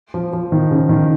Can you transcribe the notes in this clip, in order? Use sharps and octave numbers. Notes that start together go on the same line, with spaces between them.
F3
F3
D#3
C#3
D#3